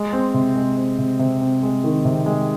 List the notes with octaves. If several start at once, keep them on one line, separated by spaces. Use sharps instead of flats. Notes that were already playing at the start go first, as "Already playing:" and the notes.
Already playing: G#3
C4
C3
G#3
C4
C3
C3
C4
G#3
D#3
C3
G#3